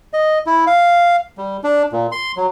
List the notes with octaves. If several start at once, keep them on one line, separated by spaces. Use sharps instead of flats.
D#5
E4
F5
G3
D4
A#2
C6
F#3